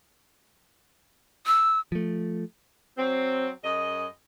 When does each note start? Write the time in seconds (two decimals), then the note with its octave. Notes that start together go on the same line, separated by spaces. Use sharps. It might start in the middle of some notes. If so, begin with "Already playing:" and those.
1.47 E6
1.92 F3 A3
2.98 F#3 C4
3.64 F#2 G#4 D#5